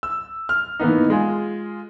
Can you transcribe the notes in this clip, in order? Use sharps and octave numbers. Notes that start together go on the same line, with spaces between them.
E6
F6
E3 A#3 B3 D#4
G#3 F4 G#4